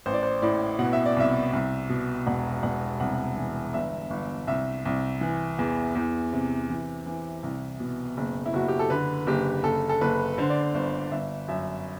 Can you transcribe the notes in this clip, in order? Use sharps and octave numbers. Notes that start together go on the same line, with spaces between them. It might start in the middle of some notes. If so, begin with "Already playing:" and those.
A1 C5
D5
C5
A2 D5
B2 F#5
E5
D5
C2 E5
C2
B2
E1 F#5
E1 F#5
C2 F#5
F#5
E3
G1 E5
G1
C2 E5
C2
E3
E2
E2
C3
E3
E3
C2
B2
F#1
E4
F#1 F#4
G4
A4
D3 B4
F#1 G4
F#1 A4
A4
F#1 B4
D3 C5
D5
C5
G1 C5
G1 E5
F#2 E5